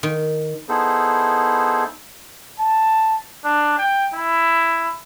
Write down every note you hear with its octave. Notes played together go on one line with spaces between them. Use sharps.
D#3
B3 D#4 E4 G#4 A4 C5
A5
D4
G5
E4